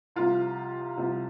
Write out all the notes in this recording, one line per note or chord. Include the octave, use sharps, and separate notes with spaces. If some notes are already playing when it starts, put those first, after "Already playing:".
C2 C3 F3 F4
C2 C3 F3